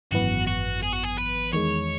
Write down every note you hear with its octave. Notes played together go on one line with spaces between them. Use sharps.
G#1 F#2 E3 B3 F#4
F#4
G#4
F#4
G#4
B4
E2 D#3 G#3 C#5